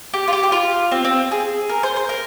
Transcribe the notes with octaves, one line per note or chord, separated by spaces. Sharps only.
G4
F4
G4
G4
F4
C4
C4
G#4
A#4
C5
C5
A#4